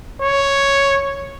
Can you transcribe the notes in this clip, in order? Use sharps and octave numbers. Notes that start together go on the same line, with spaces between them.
C#5